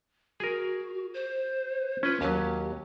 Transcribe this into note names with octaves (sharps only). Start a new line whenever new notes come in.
F#4 G#4 A#4
C5
C#4 F4 B4
D#2 F#3 G4